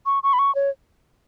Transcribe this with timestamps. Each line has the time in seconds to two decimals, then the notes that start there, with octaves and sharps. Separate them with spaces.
0.06 C#6
0.23 C#6
0.33 B5
0.39 C#6
0.55 C#5